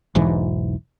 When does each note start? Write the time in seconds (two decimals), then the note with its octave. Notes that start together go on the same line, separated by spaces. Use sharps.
0.15 E1 B1 G#2 E3